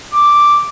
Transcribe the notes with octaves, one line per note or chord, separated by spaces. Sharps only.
D6